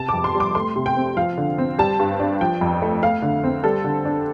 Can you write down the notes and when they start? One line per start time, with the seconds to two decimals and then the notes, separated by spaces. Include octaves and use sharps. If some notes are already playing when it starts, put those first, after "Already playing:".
Already playing: C3 A5
0.09 D6
0.14 F2
0.24 C6
0.34 G3
0.40 D6
0.55 A3 C6
0.76 C3
0.86 G5
0.97 C4
1.17 F3 F5
1.38 D3
1.58 C4
1.78 G3 A5
1.99 G2
2.20 D4
2.41 F3 G5
2.61 F2
2.82 A3
3.03 A3 F5
3.22 D3
3.44 C4
3.64 G3 A4
3.85 D3
4.05 D4